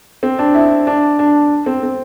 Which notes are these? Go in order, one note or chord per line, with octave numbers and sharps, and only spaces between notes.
C4
D4
E4
D4
D4
C4
C4